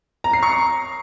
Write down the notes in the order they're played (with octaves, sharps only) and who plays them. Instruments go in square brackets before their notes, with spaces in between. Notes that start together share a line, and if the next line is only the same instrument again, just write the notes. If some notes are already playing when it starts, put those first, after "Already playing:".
[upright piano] A#5
C7
C#6
A#5